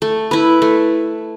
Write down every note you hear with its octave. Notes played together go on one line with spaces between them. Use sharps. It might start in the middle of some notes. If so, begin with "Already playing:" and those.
A3
E4 B4
A3